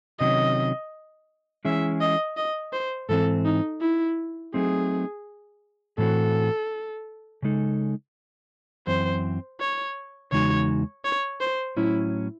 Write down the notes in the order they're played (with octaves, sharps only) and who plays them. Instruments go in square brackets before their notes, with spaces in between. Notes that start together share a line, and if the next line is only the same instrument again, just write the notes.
[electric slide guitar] C3 D#3 F#3 C#4 [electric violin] D#5
[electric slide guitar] E3 G#3 C#4 E4 G#4 [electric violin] E5
[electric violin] D#5
D#5
C5
[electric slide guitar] G#2 E3 C4 [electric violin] A4
[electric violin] D#4
E4
[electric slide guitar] F#3 A3 C4 D#4 [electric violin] G#4
[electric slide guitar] A2 E3 C4 F#4 [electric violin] A4
[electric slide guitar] C#3 G#3 D#4 A4
[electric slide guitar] F#2 E3 C4 [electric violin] C5
[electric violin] C#5
[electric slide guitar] E2 C#3 G#3 D#4 F#4 [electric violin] C#5
[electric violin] C#5
C5
[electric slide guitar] A2 F#3 C#4 [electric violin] E4